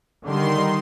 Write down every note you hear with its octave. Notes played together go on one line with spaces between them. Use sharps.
D3 D#3 G3 C6